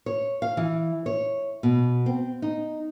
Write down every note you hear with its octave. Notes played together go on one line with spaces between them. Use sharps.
C#5
F5
E3
C#5
B2
C4
D#4